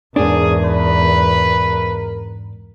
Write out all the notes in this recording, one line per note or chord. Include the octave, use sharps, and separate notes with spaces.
E2 G#2 D4 G#4 A#4
B4